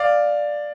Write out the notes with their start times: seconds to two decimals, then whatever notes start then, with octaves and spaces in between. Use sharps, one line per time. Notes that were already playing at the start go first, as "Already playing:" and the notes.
Already playing: D5 F5